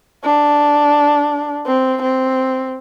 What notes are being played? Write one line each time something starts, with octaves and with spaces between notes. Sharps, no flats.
D4
C4
C4